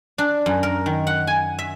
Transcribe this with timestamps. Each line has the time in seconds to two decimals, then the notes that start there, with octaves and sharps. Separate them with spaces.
0.18 D4
0.46 F#2
0.63 A#4
0.86 D#3
1.07 F#5
1.27 G#5
1.59 E5